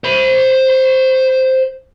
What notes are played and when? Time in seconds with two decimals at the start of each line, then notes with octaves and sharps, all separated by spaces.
0.04 C5 B5